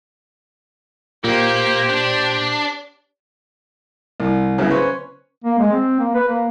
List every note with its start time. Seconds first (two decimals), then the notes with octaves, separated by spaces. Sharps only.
1.24 A#2 A#3 G4 C5
1.89 D4
4.20 C2
4.58 C#3 F#3 B3 E4
4.70 C#4 B4 C5
5.44 A#3
5.59 G#3
5.73 C4
5.99 A#3
6.15 B4
6.28 A#3